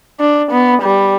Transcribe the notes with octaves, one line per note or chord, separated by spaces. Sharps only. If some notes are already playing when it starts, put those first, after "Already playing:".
D4
B3
G3